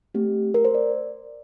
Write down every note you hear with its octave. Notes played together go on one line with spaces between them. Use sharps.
A3 C4 G4
A#4
C5
D5